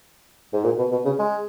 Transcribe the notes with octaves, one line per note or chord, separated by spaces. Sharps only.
G#2
A#2
B2
B2
C#3
G#3